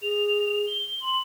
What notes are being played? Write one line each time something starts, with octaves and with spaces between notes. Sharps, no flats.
G#4 F7
G7
C6 F#7